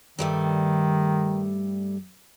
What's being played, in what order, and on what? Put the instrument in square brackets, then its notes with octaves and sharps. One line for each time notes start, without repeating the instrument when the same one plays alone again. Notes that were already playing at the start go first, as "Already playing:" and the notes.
[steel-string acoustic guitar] G2 G3 A3 [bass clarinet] D#3